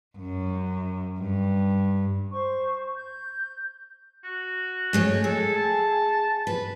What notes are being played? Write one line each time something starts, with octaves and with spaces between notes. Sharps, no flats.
F#2
G2
C5 C#6
G6
F#4
G#3 A3 C#5
G#4 A4
A5
B4